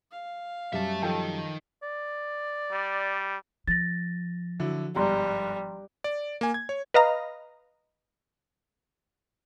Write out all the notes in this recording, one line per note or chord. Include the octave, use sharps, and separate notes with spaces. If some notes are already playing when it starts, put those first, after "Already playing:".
F5
F#2 G3 E5 A5
D#3 F3 A4 G5
D5
G3
F3 A6 A#6
D3 F#3 E4
G1 G#2 G3 A#5 C6
D5
A#3 G#5
G#6
C#5
B4 D#5 F5 A#5